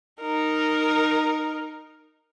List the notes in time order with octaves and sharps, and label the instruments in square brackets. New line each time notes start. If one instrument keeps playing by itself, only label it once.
[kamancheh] D#4 A#4